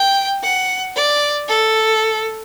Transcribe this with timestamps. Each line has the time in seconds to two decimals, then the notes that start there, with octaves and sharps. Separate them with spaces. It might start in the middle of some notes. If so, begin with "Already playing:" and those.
Already playing: G5
0.43 F#5
0.96 D5
1.48 A4